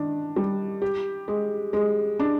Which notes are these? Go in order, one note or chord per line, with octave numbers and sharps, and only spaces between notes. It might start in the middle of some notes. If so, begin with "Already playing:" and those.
Already playing: D#3 D4
G3
G4
G#3
G#3
D4